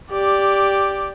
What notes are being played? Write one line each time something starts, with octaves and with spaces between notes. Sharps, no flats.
G4 D5